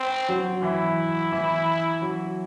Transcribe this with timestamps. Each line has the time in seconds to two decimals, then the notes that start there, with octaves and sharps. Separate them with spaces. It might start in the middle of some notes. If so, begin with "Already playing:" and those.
Already playing: C4
0.29 F#3
0.63 E3 E4
1.32 E3
2.02 F#3